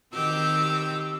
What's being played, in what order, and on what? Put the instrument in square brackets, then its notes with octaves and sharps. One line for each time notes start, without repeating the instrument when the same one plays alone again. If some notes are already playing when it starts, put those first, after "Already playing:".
[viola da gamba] D#3 C4 G4 [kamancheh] E6